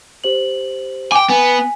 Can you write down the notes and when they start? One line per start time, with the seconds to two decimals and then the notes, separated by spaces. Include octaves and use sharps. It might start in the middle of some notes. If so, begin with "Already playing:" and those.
0.24 G4 C5 F#7
1.12 G5 G#5 D6 G7
1.30 B3 G#5